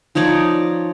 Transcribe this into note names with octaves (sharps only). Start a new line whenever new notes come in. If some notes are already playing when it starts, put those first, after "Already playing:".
F3 D#4 C#5 D5